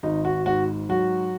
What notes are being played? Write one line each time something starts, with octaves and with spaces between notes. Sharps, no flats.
G#1 D#4
F#4
G#2 F#4
F#3 F#4